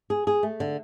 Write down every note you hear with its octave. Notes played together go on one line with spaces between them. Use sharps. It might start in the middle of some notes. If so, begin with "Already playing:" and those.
G#4
G#4
A3
D3